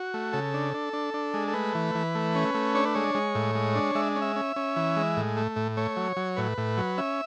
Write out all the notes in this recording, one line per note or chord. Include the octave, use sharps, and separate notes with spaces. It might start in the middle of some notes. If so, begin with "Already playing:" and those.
Already playing: F#4
A3
C#3 A4
D4
D4
D4
D4
G#3
A4
A3 B4
E3
E3
A3
C#4
A3
D4 C#5
B4
G#3 C#5
G#3
A2
G#3
D4
G#3 E5
C#4
E5
C#4
C#4
E3
G#3
A2
A3
A2
A3 C#5
F#3
F#3
A2 B4
A2
F#3
C#4 E5